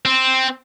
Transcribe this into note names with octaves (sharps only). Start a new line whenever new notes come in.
C4